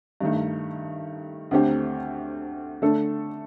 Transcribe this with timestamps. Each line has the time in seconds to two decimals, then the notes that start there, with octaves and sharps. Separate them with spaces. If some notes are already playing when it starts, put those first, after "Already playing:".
0.21 G2 D#3 A3
1.51 D2 D3 A3 C4 G4
2.82 D3 A3 D4 A4